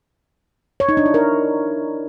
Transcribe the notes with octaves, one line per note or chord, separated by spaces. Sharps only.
C#5
D#4
D4
E4
A#4